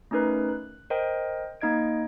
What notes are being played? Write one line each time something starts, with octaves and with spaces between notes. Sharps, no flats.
A3 C#4 D#4 A#4 B4
F#6
A#4 C5 D#5 G5
A#3 D#4 D#5 G#6 D7